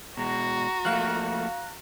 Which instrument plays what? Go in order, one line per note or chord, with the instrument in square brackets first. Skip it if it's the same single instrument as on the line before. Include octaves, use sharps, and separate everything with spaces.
[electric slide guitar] B2 G#3 [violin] F#4 [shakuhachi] A#5
[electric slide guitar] F3 A3 A#3 [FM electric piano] F5 F#6